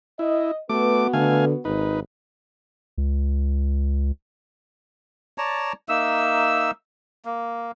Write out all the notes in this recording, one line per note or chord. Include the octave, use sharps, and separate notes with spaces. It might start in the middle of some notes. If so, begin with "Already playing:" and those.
E4 D#5
A3 B3 F#4 B4 D6
D3 A3 F5 G#5
G#1 D#4 B4
C#2
C#5 D5 A5 A#5
A#3 D#4 E5 E6
A#3